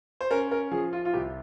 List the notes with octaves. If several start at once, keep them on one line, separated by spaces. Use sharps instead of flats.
C5
C#4 A#4
A#4
F3 G#4
F4
F4
C2 G4